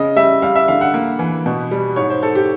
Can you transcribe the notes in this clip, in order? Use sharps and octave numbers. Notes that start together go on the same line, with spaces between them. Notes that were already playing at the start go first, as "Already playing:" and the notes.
Already playing: C#3 D#5
G3 E5
G3 F5
E5
D3 F5
F#5
A#3
E3
B2
G3
G#2 C#5
C5
G#2 A4
G4